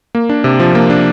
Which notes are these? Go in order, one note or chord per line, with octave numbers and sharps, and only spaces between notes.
A#3
D4
C3
F3
A#3
D4